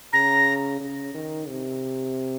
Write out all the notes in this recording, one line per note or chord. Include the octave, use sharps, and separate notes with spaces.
C#3 A#5
C#3
D#3
C3